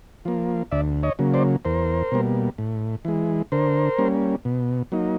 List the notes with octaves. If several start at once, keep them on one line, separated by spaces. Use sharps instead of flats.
F3 A#3
D2 D5 E5
C#5 D#5
C#3 F#3 A#3
C5 D5
E2 A#4 C5
B2 G3 A#3
A2
E3 G#3
D3 A#4 C5
G3 A#3 C#4
B2
F#3 A#3 D#4